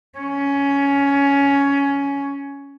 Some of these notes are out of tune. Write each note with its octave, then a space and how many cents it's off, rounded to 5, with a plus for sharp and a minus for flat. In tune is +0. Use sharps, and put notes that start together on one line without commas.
C#4 +15